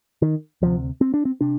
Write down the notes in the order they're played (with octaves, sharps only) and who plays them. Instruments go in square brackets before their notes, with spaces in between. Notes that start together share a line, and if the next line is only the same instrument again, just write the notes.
[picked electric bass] D#3
D2 C3 F3
C4
D4
C4
C3 D4